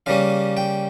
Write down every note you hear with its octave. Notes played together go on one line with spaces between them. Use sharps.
C#3 G3 A#3 C#4 F5
G5